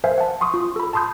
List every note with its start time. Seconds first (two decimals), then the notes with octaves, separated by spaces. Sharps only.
0.04 A#4 C5 E5 F5 G#5
0.18 F#5 A5
0.41 C6 C#6 D#6
0.54 F4
0.76 A4 B5
0.93 A5 B5 C6 D#6 G6